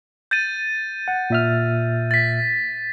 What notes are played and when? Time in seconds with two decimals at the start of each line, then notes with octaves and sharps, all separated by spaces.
0.31 G6 A6 D#7
1.08 F#5
1.30 A#2 E5 F6
2.11 A6 B6